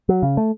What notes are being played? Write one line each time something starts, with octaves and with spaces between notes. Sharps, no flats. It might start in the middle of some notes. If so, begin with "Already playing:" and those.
F#3
C#3
A3